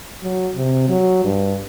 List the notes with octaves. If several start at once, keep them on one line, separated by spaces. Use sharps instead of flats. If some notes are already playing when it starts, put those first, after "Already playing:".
F#3
C3
F#3
G2